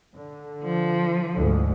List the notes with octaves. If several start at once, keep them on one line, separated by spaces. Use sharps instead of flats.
D3
F3
D2 G#2